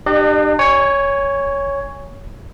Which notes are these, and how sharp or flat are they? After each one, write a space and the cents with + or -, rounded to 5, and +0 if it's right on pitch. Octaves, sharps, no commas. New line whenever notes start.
D4 +40 G4 +0 D#5 -35
C#5 +5 G#5 -15